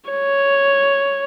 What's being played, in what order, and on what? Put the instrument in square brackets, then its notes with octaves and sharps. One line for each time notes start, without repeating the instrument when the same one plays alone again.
[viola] C#5